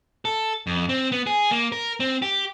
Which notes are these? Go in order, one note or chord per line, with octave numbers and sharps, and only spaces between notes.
A4
F2
C4
B3
G#4
A#3
A#4
C4
G4